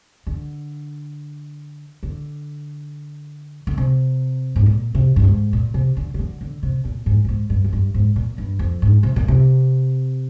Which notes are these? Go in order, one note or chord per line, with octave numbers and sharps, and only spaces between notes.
D3
D3
D3
C3
G#2
A#2
C3
G2
G#2
A#2
C3
D3
C3
D3
D3
C3
A#2
G#2
G2
G#2
G2
F2
G2
G#2
A#2
G2
F2
G#2
C3
A#2
C3